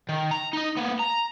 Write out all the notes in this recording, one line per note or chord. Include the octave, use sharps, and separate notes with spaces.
D#3
A#5
D#4 D#5
A#3 B3
A#5